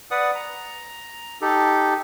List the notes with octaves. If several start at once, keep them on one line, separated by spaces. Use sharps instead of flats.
B4 D5 F#5 D#6
A#5
D#4 G4 A4